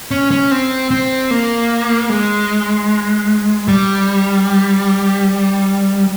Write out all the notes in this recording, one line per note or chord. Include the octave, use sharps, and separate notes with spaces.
C#4
C#4
C4
C4
A#3
G#3
G3